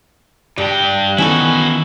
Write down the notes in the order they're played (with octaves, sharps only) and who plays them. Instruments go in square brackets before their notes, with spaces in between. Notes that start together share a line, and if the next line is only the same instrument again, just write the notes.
[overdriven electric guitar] G2 G5 [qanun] G3 [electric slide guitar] D5 A5
[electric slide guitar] D#3 E3 B3 [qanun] C#4 D#4 A4 [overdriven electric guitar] E4 F#4